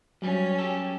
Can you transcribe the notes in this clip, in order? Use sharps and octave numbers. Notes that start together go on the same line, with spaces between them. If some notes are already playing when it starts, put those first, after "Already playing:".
G2 F#3 G3 C#4
G4 A4